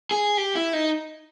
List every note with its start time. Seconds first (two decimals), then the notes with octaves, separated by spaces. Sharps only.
0.11 G#4
0.37 G4
0.55 E4
0.73 D#4